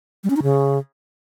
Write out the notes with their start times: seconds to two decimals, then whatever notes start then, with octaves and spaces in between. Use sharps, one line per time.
0.24 G3
0.30 C#4
0.36 D#4
0.43 C#3